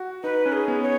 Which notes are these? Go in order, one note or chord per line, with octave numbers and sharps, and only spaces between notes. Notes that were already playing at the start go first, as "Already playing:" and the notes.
Already playing: F#4
D#4 B4
C#4
G#4
B3
C#5